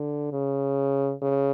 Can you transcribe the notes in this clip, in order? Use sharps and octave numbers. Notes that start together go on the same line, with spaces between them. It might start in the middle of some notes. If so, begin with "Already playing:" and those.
Already playing: D3
C#3
C#3